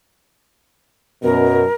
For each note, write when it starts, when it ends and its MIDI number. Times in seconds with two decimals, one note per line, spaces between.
1.23 1.64 42
1.23 1.64 47
1.23 1.74 70